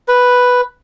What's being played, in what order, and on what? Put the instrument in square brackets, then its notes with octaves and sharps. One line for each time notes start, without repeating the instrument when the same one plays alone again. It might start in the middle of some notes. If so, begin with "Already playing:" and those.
[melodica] B4